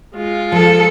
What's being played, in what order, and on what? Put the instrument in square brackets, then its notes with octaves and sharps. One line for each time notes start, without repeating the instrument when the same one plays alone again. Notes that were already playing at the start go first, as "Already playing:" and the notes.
[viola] G#3 F4
[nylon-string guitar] F3 [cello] A4